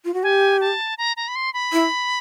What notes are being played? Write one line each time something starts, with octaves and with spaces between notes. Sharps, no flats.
F4
F#4
G4 G#5
A5
A#5
A#5
B5
C6
B5
E4